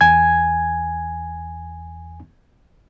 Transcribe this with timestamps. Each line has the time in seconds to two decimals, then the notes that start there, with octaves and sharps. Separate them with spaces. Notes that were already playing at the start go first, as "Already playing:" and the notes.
0.01 E2 G#5 G#6